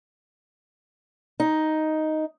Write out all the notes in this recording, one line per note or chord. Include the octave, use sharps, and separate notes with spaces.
D#4